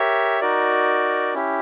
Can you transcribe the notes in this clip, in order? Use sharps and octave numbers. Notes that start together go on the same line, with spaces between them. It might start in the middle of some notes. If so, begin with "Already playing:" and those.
Already playing: G4 A#4 C#5 E5
D#4 F#4 A#4 D5
C#4 E4 G4